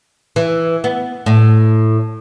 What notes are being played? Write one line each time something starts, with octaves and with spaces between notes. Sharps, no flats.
E3
B3
A2